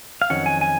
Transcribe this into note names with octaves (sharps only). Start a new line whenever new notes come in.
F5
F2 D#3 F#3 C#4 F#5
G#5
G#5